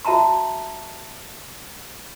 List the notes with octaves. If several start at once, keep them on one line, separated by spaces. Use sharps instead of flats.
F#4 E5 A5 A#5 C6